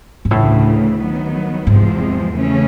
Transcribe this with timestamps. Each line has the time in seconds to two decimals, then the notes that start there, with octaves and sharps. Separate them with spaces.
0.25 G#2
0.31 D2 A2 C#3 E3 A3
0.99 D#3 F#3 B3
1.67 E2 G#2 C3 F3 G#3 C4
2.35 C#3 E3 A3 C#4